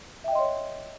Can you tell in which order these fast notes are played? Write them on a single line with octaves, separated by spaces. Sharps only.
E5 G5 D#5 C6 C#5